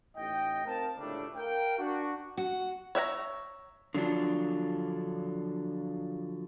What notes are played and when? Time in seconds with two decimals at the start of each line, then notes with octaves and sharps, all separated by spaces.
0.17 A1 A2 D#4 D#5 G5
0.66 C4 A#4 F5 A5
0.97 C#2 A2 D3 G3 A3 D4
1.35 A#4 F5 G5
1.78 D4 F#4
2.37 F#4
2.95 C#5 E5 F#5 A#5
3.94 D3 F3 F#3 D4 F4